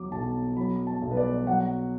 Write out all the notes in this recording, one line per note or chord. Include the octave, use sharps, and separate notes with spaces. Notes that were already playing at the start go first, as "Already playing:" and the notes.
Already playing: E2 F#3 D6
B1 A5
F#3 B5
A5
B1
B4
D5
F#3 F#5